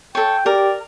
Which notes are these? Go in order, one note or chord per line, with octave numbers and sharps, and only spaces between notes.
A4 C#5 G5
G4 A#4 D5